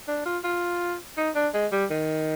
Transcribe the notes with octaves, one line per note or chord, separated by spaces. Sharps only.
D4
F4
F4
D#4
D4
G#3
G3
D#3